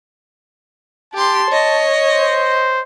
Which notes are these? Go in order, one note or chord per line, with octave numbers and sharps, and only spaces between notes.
G4 A5 C6
C#5 D#5
C5